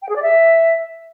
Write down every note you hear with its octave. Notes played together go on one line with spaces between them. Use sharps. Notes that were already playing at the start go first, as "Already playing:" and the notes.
G5
G#4
D5
E5